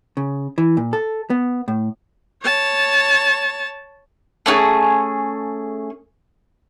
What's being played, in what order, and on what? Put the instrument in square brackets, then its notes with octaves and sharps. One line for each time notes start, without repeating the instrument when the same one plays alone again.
[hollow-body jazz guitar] C#3
E3
A#2
A4
B3
A2
[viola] C#5 A5
[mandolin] A3 C#4 F#4 G#4